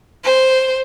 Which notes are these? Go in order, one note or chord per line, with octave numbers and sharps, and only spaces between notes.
C5